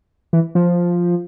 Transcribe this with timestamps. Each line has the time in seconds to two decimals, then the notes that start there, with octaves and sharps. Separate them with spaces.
0.33 E3
0.55 F3